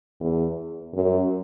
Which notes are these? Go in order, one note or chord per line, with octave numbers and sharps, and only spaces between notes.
E2
F#2